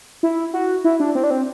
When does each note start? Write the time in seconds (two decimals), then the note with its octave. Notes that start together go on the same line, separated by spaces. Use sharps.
0.23 E4
0.53 F#4
0.85 E4
1.00 D4
1.15 C4
1.24 D4
1.31 C4